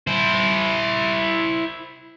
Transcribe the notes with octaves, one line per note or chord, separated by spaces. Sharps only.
E4 C5